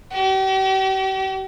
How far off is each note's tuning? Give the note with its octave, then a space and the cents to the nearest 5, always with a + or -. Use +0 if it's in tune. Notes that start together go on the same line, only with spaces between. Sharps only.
G4 -40